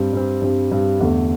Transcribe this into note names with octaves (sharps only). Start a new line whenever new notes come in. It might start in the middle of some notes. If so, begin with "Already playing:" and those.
Already playing: G2 G3 C4
G2 G3 C4
G2 G3 C4
G2 G3 C4
E2 D3 A3